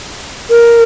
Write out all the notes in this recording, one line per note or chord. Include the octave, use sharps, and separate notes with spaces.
A#4